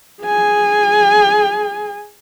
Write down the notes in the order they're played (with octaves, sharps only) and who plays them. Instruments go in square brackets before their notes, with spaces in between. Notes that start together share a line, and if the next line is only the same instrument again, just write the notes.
[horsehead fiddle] G#4 G#5